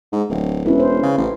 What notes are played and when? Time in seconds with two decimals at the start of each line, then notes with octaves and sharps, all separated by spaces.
0.13 G#2
0.30 D1
0.65 E1 C#4 E4 B4
0.80 C5
1.03 C#3
1.18 A1